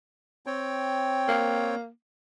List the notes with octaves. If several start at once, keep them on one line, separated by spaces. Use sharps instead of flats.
C4 C#5 G5
A#3